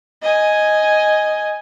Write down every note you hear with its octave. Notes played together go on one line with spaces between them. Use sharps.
D#5 G#5